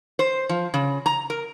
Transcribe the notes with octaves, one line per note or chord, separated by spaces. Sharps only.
C5
F3
C#3
A#5
A#4